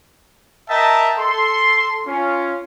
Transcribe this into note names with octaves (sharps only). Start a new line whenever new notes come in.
A#4 D#5 E5 G5 A5 A#5
A4 C6
C#4 F4